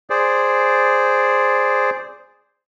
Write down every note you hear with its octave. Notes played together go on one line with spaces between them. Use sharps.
G#4 C5 D5